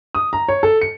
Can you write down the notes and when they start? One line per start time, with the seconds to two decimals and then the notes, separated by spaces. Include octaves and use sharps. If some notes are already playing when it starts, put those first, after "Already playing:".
0.15 D#6
0.33 A#5
0.49 C#5
0.63 A4
0.82 C#7